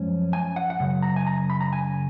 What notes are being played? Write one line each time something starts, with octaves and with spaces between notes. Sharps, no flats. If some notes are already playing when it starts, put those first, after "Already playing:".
Already playing: F#2 F3 G#3 C#4
G#5
F#5
F#5
F#2 C#3
A#5
G#5
A#5
B5
A#5
G#5